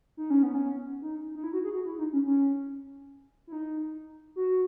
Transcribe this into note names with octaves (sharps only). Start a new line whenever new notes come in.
D#4
C#4
B3
C#4
D#4
D#4
E4
F#4
G#4
F#4
E4
D#4
C#4
C#4
E4
D#4
F#4